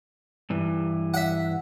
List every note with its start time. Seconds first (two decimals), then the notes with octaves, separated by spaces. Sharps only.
0.50 G2 E3
1.14 E5 F#5